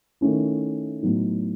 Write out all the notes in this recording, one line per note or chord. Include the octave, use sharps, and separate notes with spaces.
D#3 A3 C#4 E4
A2 F#3 B3 D#4